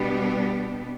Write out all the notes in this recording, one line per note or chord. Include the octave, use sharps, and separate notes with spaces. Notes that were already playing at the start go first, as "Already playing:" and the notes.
Already playing: B2 G3 B3 D4 G4